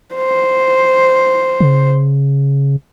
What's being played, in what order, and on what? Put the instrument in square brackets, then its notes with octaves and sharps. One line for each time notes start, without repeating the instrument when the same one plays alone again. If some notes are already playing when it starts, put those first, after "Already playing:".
[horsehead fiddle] C5
[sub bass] C#3